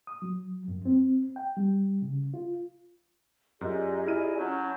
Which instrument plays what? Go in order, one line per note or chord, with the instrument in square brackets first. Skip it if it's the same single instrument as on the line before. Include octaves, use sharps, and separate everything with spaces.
[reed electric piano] D#6
F#3
F#2
C4
G5
G3
C#3
F4
[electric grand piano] F#2 [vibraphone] F4 G4 A#5 [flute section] G#4 D5 D#5
[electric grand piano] E4 F6 D#7
[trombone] F#3 [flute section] C#4 A5 G6